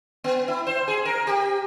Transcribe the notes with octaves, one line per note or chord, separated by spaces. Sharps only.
B3
E4
C5
G#4
A#4
G4